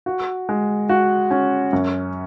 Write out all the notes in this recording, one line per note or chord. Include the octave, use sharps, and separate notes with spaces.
F#4
G#3
F#4
C#4
F#2